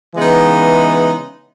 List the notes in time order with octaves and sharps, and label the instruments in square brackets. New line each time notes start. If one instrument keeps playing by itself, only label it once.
[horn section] C#3 E3 G#3 B3 D#4